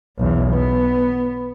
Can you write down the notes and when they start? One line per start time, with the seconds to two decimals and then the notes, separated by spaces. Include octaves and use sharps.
0.18 B1 E2
0.53 B3